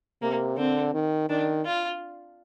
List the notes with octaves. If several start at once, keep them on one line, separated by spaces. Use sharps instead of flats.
C3 A#3
D3 C4
D#3
D#3 D4
F4